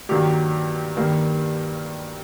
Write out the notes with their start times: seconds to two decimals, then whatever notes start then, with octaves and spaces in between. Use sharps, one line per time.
0.09 G2 D#3 F#3 A#3 G4
0.97 G2 D#3 G3 A#3